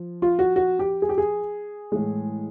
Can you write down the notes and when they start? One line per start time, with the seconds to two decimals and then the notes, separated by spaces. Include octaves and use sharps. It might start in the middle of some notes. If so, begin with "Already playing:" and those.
Already playing: F3
0.22 F4
0.39 F#4
0.56 F#4
0.79 G4
1.02 G#4
1.09 G4
1.18 G#4
1.92 A2 E3 G#3